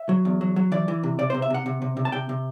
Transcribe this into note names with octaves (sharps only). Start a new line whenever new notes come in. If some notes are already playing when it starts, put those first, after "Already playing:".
Already playing: E5
F#3
E2
F#3
F#3
E3 D5
E3
C3
C3 D5
C3 C5
E5
C3 F#5
C3
C3
C3
A5
C3 G5
C3